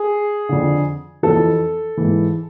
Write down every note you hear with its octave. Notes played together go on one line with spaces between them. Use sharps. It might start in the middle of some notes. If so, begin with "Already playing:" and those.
Already playing: G#4
F2 D3
F2 E3 A4
G#2 E3